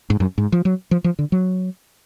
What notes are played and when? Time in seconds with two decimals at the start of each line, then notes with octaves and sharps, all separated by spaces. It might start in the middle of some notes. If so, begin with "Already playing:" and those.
0.10 G#2
0.20 F#2
0.38 G#2
0.52 F3
0.65 F#3
0.91 F3
1.04 F3
1.19 D3
1.32 F#3